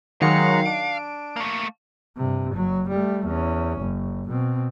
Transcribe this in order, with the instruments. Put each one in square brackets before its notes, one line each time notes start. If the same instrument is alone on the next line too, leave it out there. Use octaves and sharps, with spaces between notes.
[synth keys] D#3 F#3 C#7 [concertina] G#3 F#5 A#5 [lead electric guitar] F5
[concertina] D4 [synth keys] D7
[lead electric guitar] A3 A#3
[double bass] G2 C3
F#1 F#3
G3 A3
E2 C#4
F#1
B2 C4